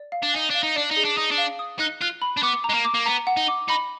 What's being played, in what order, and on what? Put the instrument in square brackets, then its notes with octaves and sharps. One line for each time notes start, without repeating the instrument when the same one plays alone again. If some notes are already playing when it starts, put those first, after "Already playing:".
Already playing: [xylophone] D5
F5
[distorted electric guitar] D4
[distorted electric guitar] D#4 [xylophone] G#5
[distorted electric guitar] D4 [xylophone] F5
[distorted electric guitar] D#4
[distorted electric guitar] D4 [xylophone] D5
[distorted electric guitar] D#4
[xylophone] G#4
[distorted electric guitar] D4
[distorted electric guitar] D#4 [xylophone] D#6
[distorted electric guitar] D4
[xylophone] F5
D#6
[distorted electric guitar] D#4 [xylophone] F#6
[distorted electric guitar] F4 [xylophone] F#6
[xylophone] B5
[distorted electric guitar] D4
[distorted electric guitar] B3 [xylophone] D6
[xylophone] A#5
[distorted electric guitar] G#3
A#3
[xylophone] D6
[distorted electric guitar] A#3
[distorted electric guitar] B3 [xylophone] A#5
[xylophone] F#5
[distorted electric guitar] D#4
[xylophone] D6
[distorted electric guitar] D#4 [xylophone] B5